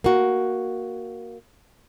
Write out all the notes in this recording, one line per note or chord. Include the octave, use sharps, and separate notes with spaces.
A#3 F#4